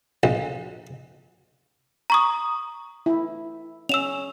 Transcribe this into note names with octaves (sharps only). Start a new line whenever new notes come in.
A#1
A#5 C#6 D#6
E4
C#4 E6 E7 F7